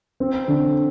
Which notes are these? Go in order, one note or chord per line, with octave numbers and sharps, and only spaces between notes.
C4
D3